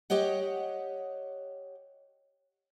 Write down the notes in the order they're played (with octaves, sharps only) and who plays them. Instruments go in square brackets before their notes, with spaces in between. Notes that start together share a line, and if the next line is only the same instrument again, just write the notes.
[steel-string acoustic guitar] G4 C#5 D#5 F#5